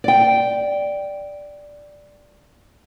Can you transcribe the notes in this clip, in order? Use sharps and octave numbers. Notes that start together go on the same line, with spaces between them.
D5 G5